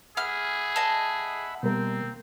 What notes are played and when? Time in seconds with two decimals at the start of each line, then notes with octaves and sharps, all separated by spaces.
0.17 G#4 E5 F#5 B5 F6
0.76 D#5 A5
1.63 B2 G3 A#3 C4 A#4